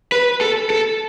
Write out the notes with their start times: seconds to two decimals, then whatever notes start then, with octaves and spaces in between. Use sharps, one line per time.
0.12 B4
0.41 A4
0.70 A4